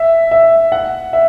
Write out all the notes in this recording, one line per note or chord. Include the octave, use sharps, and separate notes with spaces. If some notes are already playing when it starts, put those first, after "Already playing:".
Already playing: E5
E5
F#5
E5